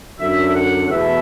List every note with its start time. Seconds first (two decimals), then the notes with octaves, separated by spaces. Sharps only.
0.18 F#2 D3 F#3 E5
0.54 F#5
0.88 E2 B2 A3 E5